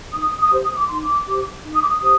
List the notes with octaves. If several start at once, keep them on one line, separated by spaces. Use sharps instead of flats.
D#4 D#6
D#6
G4 C5
D#6
D6
D#4 C6
D6
G4 C5
D#4
D#6
D6
D#6
G4 C5 D#6